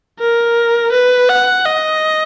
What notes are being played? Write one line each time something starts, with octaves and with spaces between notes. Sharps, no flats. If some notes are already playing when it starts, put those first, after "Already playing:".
A#4
B4
F#5
D#5